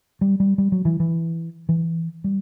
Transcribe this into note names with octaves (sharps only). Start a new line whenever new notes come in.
G3
G3
G3
F#3
E3
E3
E3
G3